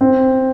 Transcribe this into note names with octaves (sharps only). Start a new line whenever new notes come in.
C4